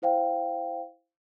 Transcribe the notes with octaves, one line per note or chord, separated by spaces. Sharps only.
E4 C5 F5 G5